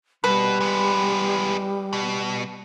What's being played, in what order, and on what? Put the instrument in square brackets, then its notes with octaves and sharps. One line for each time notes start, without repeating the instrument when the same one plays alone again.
[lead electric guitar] B2 [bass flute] G3 [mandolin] B4
[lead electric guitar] G#3 B3
B2